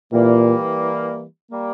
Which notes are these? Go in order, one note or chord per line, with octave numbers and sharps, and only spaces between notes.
A#2 E3 G3 A#3
G3 A#3